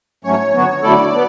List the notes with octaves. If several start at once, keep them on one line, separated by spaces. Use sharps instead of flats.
G#2 F#3 A3 C#4 C#5
D3 F#3 B3 F#4
D3 F#3 A3 E4 A4 D5
B3